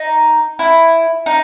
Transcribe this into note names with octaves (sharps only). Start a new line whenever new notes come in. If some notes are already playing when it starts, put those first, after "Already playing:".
Already playing: D#4
E4
D#4